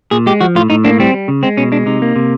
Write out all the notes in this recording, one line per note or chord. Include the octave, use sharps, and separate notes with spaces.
A#2 G#4
G#3 G4
F3 F#4
A2 F4
A2 D#4
A#3 D4
G3 C4
G3
C#3
G#3 C4
B2 C#4
G#3 D4
C3 D#4
A#3
C3